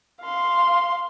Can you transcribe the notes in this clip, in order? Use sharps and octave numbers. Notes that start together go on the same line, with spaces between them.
F5 C6